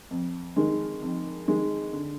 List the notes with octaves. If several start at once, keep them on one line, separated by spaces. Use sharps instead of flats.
F2
D#3 G#3
F2
D#3 G#3
D3